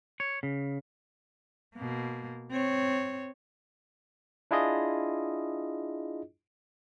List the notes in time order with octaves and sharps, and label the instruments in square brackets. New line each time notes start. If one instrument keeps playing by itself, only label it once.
[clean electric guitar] C#5
C#3
[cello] B2 A#3
C4 C#5
[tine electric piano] D4 E4 F4 G#4 D#5